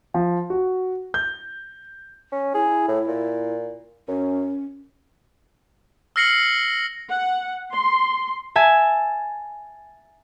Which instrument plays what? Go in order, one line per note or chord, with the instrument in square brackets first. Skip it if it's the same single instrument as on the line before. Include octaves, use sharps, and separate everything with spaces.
[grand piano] F3
F#4
G6
[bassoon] C#4
[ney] E4 [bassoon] G#4
[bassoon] A2
A#2
[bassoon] F#2 [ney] C#4
[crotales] E6 F6 A#6 C7 C#7 F#7
[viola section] F#5
C6
[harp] E5 G#5 A5